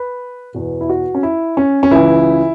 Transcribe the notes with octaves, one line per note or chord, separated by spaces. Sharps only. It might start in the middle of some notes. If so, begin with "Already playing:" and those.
Already playing: B4
E2 B2
E4
F#4
C#4
E4
C#4
C#4
C#2 C#3 E3 E4